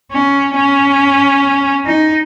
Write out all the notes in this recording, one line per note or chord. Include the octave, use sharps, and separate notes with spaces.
C#4
C#4
D#4